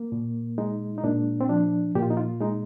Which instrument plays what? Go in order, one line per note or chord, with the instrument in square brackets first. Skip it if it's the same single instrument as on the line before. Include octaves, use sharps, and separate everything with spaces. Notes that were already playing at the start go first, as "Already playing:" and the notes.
Already playing: [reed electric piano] A#3
A#2
G#3 D#4
D#4
A#2 D4
C4
F3 D4
A#2 G4
F4
D#4
F4
G#3 D#4